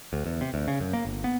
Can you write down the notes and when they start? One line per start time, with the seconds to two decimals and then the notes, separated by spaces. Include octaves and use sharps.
0.13 D2
0.26 E2
0.41 C3
0.54 D2
0.68 C#3
0.80 F#2
0.93 A#3
1.05 G1
1.24 B3